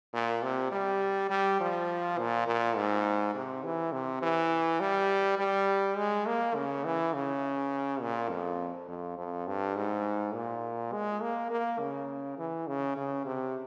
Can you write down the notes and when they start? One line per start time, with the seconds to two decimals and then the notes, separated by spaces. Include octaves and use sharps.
0.14 A#2
0.43 C3
0.72 G3
1.30 G3
1.60 F3
2.18 A#2
2.47 A#2
2.76 G#2
3.35 C3
3.64 E3
3.93 C3
4.22 E3
4.80 G3
5.39 G3
5.97 G#3
6.26 A#3
6.55 C#3
6.85 E3
7.14 C#3
8.01 A#2
8.29 F2
8.88 F2
9.18 F2
9.47 G2
9.76 G#2
10.34 A#2
10.92 G#3
11.22 A#3
11.51 A#3
11.80 C#3
12.38 E3
12.67 C#3
12.97 C#3
13.25 C3